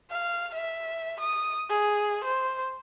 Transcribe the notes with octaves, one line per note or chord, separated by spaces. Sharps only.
F5
E5
D#6
G#4
C5